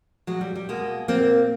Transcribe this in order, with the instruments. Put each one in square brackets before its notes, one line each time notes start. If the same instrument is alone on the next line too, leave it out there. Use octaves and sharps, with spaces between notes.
[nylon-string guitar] A#2 F#3 G#3
G3
G3
B2 G#3 A#3
A#2 A#3 C4